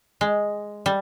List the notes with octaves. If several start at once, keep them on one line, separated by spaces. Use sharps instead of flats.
G#3
G3